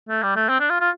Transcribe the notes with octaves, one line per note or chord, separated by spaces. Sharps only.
A3
G3
A3
C4
D4
F4
F4